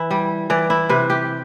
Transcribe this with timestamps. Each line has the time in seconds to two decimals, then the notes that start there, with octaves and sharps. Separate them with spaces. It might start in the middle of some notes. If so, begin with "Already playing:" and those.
Already playing: E3 E4
0.11 G3
0.50 E3 D5
0.70 E4
0.89 C3 B4
1.10 G4